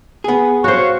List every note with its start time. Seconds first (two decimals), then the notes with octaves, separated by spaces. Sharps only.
0.24 B3 G#4
0.64 F#4 C5 C#5 F5 C#6